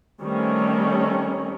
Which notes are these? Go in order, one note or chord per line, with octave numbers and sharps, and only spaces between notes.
D#3 G3 A3 C4 C#4 C#5